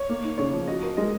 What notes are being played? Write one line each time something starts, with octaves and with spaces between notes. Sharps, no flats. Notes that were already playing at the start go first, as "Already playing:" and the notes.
Already playing: C#5
A#3
D#4
C#3 C#5
F3
F#4 D#5
A#4
G#3 D#5